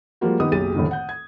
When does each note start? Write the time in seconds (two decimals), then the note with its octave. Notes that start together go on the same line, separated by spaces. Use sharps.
0.21 F3 G3 G#3 A#3 F#4
0.40 D#3 B3 D#4 G4 D#6
0.52 F#1 B1 G4 G#4 A6 D#7
0.74 F1 A2 D3 D#3
0.91 F#5 G6
1.09 G#6